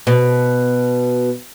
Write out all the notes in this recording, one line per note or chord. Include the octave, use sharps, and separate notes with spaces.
B2